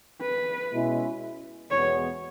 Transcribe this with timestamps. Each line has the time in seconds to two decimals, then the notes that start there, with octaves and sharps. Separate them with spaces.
0.21 B4
0.72 B2 G#3 C#4 E4
1.70 E2 B2 G#3 B3 C#5